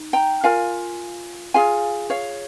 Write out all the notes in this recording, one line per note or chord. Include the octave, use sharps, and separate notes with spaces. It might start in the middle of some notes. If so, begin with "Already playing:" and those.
Already playing: D#4
G5 A#5
F4 A#4 F5 G#5
F4 G#4 F5 G#5
C#5 F5